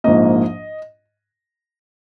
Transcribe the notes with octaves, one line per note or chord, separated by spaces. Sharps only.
A#1 G#2 F3 A#3 D#5